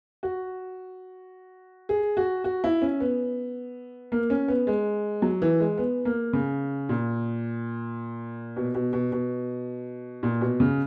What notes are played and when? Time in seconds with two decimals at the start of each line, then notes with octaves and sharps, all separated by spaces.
0.23 F#4
1.89 G#4
2.17 F#4
2.44 F#4
2.64 E4
2.82 C#4
3.00 B3
4.12 A#3
4.30 C#4
4.48 B3
4.67 G#3
5.22 F#3
5.42 E3
5.60 G#3
5.78 B3
6.05 A#3
6.33 C#3
6.89 A#2
8.56 B2
8.75 B2
8.93 B2
9.12 B2
10.23 A#2
10.41 B2
10.60 C#3